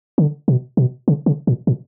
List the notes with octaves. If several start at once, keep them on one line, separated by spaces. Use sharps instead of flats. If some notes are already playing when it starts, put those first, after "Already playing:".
D3
B2
B2
C#3
C#3
A#2
A#2